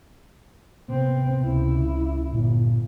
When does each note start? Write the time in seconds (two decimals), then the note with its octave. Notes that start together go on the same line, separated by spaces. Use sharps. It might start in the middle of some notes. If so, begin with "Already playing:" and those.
0.89 C3 B3 C4
1.42 C#2 E4
2.32 G1 A#2